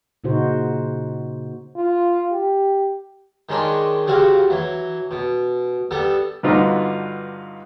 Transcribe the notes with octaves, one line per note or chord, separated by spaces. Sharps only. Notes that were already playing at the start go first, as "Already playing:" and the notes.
A#2 C#3 D#4 F#4 C5
F4
G4
D#3 G#3 C#4 D4 C6
C#3 G3 C4 F#4 F5
E3 F#3
B2
G3 B3 A4
G2 D3 B3 D#4 F4 F#4